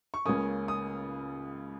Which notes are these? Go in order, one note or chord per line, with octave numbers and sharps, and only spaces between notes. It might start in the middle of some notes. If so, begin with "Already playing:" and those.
C#6
C#2 C#3 A#3 C#4 D#6
D#6